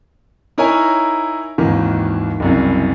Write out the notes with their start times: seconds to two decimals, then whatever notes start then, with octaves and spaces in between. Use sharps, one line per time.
0.58 D#4 E4 A#4 C#5 G#5
1.58 G#1 D#2 D#3 E3
2.40 F#1 C2 F#2